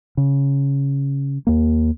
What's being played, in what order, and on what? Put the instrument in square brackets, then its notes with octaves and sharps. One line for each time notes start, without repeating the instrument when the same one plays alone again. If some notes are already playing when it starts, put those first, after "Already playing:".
[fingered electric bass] C#3
D#2 A#3